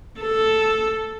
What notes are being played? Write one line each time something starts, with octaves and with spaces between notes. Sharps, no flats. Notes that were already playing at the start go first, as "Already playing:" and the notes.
A4